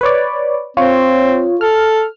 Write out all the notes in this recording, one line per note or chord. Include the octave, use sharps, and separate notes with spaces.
B4 C#5 D5
C4 F4 C#5
A4 F6